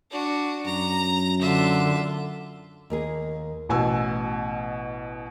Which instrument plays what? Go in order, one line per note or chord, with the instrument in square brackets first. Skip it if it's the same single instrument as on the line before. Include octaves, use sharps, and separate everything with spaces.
[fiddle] D4 F#4
[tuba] F#2 [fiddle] A#5
[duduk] D3 [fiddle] F4 E5
[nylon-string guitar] D#2 A#3 G#4
[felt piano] A1 B2 G#5 E6